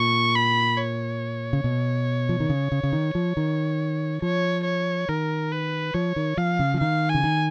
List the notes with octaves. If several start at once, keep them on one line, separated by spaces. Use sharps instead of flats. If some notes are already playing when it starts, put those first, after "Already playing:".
Already playing: A#2 C#6
B5
C#5
C#3
B2
F3
D#3
C#3
C#3
C#3
D#3
F3
D#3
F3 C#5
C#5
D#3 A#4
B4
F3 C#5
D#3
F3 F5
C#3
F3
D#3 F5
C#3 G#5
D#3